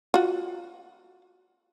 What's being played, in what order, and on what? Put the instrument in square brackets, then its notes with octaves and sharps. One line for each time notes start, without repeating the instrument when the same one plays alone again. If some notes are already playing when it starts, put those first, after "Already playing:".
[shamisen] F4 F#4